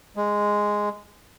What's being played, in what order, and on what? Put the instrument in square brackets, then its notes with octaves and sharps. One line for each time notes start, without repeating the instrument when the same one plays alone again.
[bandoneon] G#3